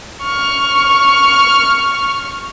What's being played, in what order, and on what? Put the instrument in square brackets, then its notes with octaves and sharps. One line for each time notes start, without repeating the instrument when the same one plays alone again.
[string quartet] C#6 F6